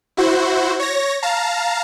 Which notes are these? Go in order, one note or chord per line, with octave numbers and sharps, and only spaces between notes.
E4 F#4 C5
C#5 A#6
F5 A5 A#5